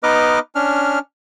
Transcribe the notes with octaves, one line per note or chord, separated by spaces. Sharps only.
B3 D#4 B4 D#5 D6 F6
C#4 D4 F6